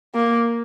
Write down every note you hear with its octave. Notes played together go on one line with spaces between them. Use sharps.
A#3